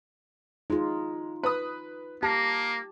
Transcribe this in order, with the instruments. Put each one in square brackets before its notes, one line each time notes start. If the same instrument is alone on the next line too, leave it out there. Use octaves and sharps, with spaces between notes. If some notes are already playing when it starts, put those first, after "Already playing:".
[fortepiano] G#3 [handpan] D#4 F4
[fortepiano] B4 D#6
[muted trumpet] A#3 [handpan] G4 [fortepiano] A5